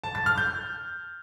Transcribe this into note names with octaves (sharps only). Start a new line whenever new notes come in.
A5
A6
F6
G6